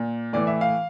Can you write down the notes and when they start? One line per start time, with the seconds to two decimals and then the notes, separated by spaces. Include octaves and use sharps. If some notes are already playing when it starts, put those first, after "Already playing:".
Already playing: A#2
0.33 A2 E3 D5
0.47 E5
0.61 F5